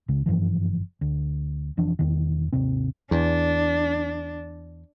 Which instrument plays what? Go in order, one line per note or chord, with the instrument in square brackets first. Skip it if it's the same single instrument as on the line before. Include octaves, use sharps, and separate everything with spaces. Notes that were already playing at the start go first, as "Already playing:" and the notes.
[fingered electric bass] C#2 C#3
F#1 G2 E3 F3
D2
F1 F2 E3 D4
E1 E2 D#3
G#1 D#2 C3 C4
[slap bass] E2 [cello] D4